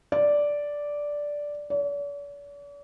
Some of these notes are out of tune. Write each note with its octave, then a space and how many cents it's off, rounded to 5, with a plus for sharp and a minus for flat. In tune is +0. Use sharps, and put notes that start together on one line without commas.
D5 -5
D5 -45